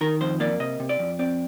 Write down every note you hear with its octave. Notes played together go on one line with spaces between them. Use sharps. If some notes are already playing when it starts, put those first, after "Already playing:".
D#3 A#4
F2 C5
A#3 D5
C3 D#5
C3
D5
F2
C4 D5